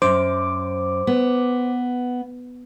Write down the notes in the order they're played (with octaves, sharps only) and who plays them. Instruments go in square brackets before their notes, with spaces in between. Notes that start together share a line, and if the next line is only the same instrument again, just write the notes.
[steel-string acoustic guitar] F#2 [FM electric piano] C5 D6
[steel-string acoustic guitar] B3